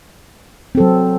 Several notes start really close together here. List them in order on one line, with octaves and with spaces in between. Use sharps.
C4 A4 F#3